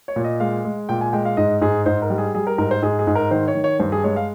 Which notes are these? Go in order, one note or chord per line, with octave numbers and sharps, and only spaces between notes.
C#5
A#2
D#5
G#3 F5
G#3
A#2 G5
G#5
G#3 G5
F5
G#2 D#5
G#2 G#4
G#2 C5
A#4
G3
G#4
G3 G#4
A#4
G#2 A#4
C5
G#2 G#4
G#4
G#2
A#4
D#3 C5
C#5
D#3
C#5
G2 C5
G#4
G#3 C#5
F5